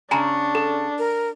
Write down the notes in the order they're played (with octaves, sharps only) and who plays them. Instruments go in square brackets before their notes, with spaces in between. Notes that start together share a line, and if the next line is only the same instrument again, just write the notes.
[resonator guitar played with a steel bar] C#3 C#4 [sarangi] D4 [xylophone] G#5 A#5 B5
[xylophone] A4
[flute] A#4